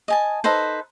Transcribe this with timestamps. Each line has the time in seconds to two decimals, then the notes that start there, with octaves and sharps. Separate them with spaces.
0.08 D#5 G#5 A5
0.44 D#4 A4 B4 C5